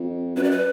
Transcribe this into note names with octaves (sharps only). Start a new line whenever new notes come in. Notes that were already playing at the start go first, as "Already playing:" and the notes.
Already playing: F2
F#2 B4
D5
B4